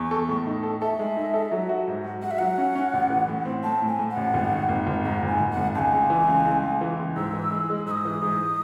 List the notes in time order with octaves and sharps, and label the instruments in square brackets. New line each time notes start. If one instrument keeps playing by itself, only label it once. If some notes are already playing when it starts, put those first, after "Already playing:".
Already playing: [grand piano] E2 [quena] C#6
[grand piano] A4
A2
D#4
A4
[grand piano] A4 [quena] E5
[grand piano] G#3
D#4
A4
F#3
F#4
G#2
F#4
[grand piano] F#4 [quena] F#5
[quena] E5
[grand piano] F#3 [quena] F#5
[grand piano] C#4
C#4
A1
E3
A2
C4
[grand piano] A2 [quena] A5
[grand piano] A2
[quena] G#5
[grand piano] A2
[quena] F#5
[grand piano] A1
G#1
D#3
G#1
G#1
[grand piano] G#2 [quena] F#5
[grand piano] G#1
[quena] G#5
[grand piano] G#1
[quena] F#5
[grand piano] G#1
[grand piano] C#2 [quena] A5
[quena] G#5
[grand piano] C#2
E3
C#2
C#2
C#2
E3
C#2
[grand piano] G#2 [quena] E6
[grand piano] E3
G#3
G#3
[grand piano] G#2 [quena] E6
[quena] D#6
[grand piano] E3
G#2